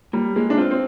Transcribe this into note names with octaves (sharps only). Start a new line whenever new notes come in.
G3 A#3
G#3 A#3
D4
C4 F4
C4